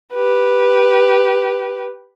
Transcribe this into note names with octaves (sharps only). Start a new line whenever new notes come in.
G4 B4